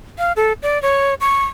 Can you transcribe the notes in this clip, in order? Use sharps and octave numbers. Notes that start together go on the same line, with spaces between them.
F5
A4
D5
C#5
C#6